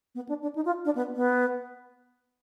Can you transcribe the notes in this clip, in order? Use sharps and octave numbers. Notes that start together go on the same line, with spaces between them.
B3
D4
D4
D#4
F4
D4
B3
B3